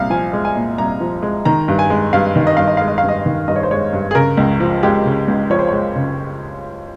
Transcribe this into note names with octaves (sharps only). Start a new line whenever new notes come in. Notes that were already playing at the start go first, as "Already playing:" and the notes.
Already playing: C2 A#2 F5
F3 G#5
G#3
G#5
A#2
C2 A#5
F3
G#3
D#3 A#5
G2
G#5
G#3
G2 F5
D#3
D#5
G2 F5
D#5
G#3 F5
D#5
F5
G2
D#5
D#3
G2 D#5
C#5
C5
G#3 C#5
G2
G#4
C#3 A#4
C#2
F3
G#3 G4
C#3
C#2
F3 C#5
C5
G#3 C#5
C#3